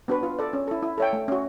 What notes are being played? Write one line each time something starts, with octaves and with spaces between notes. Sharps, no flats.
B3 D4 F#4 B4
F4
A4 D5
C#4
E4 A4
E4
A4 C#5 E5 G5
A3
C#4 F#4